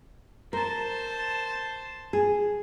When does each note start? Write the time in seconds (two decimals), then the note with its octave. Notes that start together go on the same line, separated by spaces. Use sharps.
0.53 A#4 C5 A5
2.13 G#4